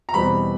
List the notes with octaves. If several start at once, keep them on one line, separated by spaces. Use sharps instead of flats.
A#5
E2 B2 G3 C4 B5